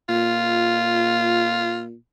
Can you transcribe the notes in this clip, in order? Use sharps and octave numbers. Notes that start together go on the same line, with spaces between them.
A#2 F4